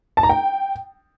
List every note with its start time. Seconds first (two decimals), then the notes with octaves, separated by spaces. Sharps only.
0.17 A5
0.23 A#5
0.29 G5